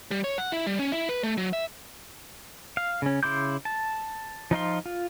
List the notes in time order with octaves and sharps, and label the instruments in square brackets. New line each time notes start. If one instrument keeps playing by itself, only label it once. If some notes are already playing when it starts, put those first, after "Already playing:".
[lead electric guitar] G3
C#5
F#5
E4
G3
C#4
E4
B4
A3
F#3
E5
[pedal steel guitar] F5
C#3 C#4
C#3 E4 C6 D6 G6
A5
F3 D#4 F4 C6
F4